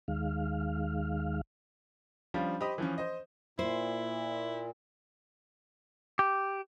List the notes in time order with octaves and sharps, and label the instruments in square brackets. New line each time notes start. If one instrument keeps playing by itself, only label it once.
[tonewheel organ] D#2 D#3 G#3 F5
[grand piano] F3 G3 C#4 D4 F4
G4 C5 D#5 B5 D#6
E3 F3 C#4
C5 D#5
[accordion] A#2 [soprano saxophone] E4 [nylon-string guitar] C5
[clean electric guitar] G4